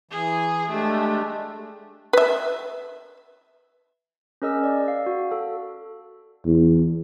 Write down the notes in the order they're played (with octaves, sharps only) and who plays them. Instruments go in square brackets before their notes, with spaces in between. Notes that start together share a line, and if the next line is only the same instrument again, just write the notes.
[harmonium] E3 [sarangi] G#4
[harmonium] G#3 D4 G4 [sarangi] A3
[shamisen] B4 E5
[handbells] C#4 G#4 A#4 D#5 E6
D5
F5
F#4
A4
[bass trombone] E2